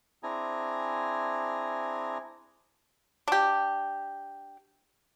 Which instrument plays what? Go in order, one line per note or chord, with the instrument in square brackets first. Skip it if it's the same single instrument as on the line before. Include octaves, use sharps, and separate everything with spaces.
[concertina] C4 D4 E4 G#4 G#5 A#5
[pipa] D4 G4